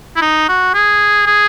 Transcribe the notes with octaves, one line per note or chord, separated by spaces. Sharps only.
E4
D#4
F#4
G#4
G#4